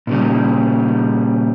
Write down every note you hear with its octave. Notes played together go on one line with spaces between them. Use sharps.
A#2 C#3 G3